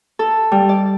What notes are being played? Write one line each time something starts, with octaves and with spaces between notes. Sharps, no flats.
A4
G3
D5